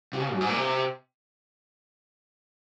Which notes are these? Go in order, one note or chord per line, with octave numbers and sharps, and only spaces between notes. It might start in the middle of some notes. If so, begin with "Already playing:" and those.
C3
C#3
F#2
G#2
A#2
C3